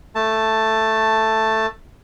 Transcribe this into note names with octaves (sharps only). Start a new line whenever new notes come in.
A3 A5